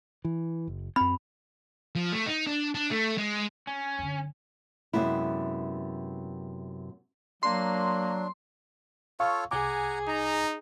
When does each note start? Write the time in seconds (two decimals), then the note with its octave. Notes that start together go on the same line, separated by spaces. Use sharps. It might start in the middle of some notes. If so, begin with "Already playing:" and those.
0.25 E3
0.67 F#1
0.96 F#2 C4 B5
1.95 F3
2.12 A3
2.26 D#4
2.47 D4
2.75 D4
2.91 A3
3.18 G#3
3.67 C#4
3.98 F#2 D3
4.93 F#2 C3 G#3 B3 E4
7.43 F#3 A#3 D4 C6
9.20 F4 A4 C#5 F5 C#6
9.51 C2 G#4 F#5 G#5 A#5 D6
10.09 D#4 A#5